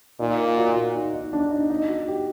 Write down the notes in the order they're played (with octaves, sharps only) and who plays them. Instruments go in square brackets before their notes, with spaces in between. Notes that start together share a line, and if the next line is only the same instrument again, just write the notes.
[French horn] A#2 [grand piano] D#4
[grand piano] F#4
D#4
D#4
D4
D#4
D#4
F#4
G4